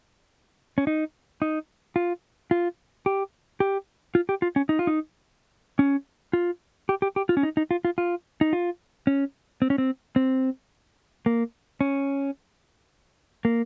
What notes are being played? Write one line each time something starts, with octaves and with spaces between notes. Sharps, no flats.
C#4
D#4
D#4
F4
F4
G4
G4
F4
G4
F4
C#4
D#4
F4
D#4
C#4
F4
G4
G4
G4
F4
C#4
D#4
D#4
F4
F4
F4
D#4
F4
C#4
C4
C#4
C4
C4
A#3
C#4
A#3